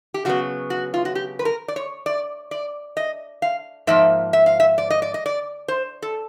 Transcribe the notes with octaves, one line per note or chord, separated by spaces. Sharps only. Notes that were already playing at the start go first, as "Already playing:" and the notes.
G4
C#3 F#3 B3 F#4
F#4
F4
F#4
G4
B4
A#4
D5
C#5
D5
D5
D#5
F5
G#2 F3 A#3 E5
E5
F5
E5
D5
D#5
D5
D#5
D5
C5
A4